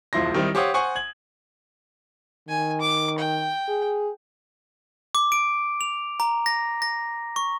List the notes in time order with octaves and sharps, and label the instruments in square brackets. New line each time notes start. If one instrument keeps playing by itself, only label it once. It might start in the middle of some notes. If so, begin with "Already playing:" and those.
[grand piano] E1 C#2 F3 E4 C6 A#6
D#3 G3 C4 D#4 E4
G4 C5 C#5 F5 F#5 D#6
C5 F#5 G#5 C#6
G#6 F#7
[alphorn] D#3 [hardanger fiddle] G#5
[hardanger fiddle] D6
G5
[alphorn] G#4
[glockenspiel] D6
D7
F7
A#5
A#6
A#6
C#6